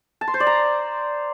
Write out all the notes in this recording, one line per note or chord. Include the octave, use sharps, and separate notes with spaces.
A5
C6
C5
D5
A#5